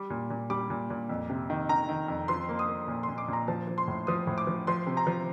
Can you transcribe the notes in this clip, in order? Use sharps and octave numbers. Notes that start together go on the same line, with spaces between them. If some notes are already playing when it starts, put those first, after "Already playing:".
Already playing: G3 D6
A#2
A#2
G3 D6
A#2
A#2
F2
C3
D#3
D#3 A#5
D#3
F2
F3 C6
A#3
D#6
A#3
A#2
A#2 C6
D6
A#2 A#5
F3 A5
F3
C6
A2
F3 D#6
A2
D6
F3
F3 C6
C3
A#5
F3